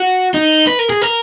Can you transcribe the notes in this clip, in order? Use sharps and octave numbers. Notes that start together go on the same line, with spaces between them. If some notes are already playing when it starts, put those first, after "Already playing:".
Already playing: F#4
D#4
B4
A#4
G#4
A#4